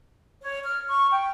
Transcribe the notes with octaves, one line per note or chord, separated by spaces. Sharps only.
C#5
F6
C#6
G5